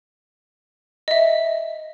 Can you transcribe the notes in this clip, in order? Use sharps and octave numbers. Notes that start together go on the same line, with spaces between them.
D#5 E5